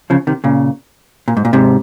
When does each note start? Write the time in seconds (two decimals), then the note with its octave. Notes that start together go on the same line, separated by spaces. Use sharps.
0.10 C#3 F3
0.27 C3 D#3
0.44 A#2 C#3
1.28 A#2
1.37 G#2
1.45 A#2
1.53 G#2 C3